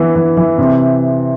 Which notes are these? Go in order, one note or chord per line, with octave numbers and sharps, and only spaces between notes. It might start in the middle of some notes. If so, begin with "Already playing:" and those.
Already playing: E3 B3
E3
E3
C3